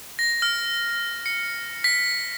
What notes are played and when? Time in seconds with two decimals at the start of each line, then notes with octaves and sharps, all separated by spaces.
0.19 A#6
0.42 F6
1.26 C#7
1.84 B6